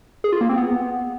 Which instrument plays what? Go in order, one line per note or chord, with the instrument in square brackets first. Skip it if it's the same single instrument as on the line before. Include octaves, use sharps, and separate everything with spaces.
[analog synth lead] G#4
F4
A#3
C4
B3